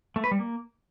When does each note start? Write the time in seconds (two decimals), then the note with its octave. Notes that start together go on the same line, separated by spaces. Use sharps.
0.16 A3
0.24 B4
0.31 G3
0.39 A#3